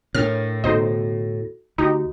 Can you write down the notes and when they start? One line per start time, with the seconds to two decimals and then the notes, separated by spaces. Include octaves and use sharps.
0.15 A2 D4 A#4 C#5 F6
0.64 D2 B2 D#4 F#4 A4 C5 D#5
1.78 D2 D#4 F#4 G4